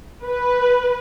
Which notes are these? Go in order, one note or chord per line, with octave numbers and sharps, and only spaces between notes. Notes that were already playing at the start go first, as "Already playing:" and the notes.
B4